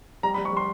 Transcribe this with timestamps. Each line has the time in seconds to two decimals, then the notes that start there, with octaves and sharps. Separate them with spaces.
0.23 G3 A#5
0.34 B5
0.38 G3
0.45 C#6
0.53 G3 C6